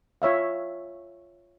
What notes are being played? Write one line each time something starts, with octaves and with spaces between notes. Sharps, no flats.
F4 C#5 E5 F5